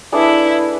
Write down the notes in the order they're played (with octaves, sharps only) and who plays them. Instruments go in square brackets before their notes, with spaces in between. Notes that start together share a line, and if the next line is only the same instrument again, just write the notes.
[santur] A3 D4 G#4 B4 [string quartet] E4